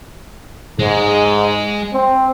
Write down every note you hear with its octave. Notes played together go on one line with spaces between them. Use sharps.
G#2 G#3
C4